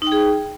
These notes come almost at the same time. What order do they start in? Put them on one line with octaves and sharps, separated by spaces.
D#4 G5 G#4